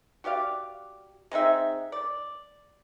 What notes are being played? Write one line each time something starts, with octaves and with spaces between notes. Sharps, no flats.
F#4 G4 D5 F5
G#3 C4 D#4 E5
D5